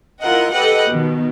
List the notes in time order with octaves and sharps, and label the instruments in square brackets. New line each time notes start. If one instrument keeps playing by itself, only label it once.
[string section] E4 F4 A#4 D#5 F#5
G4 A4 B4 D#5 F#5 G5
B2 D#3